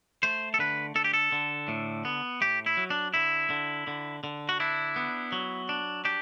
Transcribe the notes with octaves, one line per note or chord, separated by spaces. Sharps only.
A3 C5
A4
D3 B4
D3 A4
G4
A4
D3
A2
B3
A2 G4
E4
F#3
D4
D3 E4
D3
D3
D3
F#4
D4 E4
B3
F#3
D4
D4 G4